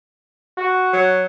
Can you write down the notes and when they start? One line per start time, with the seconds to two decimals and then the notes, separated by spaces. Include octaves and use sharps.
0.57 F#4
0.93 F#3